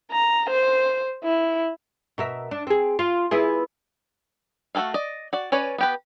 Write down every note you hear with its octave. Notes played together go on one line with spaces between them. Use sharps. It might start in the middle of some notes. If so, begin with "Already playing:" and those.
A#5
C5
E4
B2 A#4 E5
D4
C4 G#4
F4
B3 E4 G#4
A3 F#4 G#4 A4 F5
D5 D#5
F#4 D5
C#4 B4 C#5 D5
B3 G4 B4